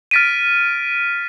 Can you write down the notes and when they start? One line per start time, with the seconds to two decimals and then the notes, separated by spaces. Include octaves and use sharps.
0.11 F6 A6 B6 D7 D#7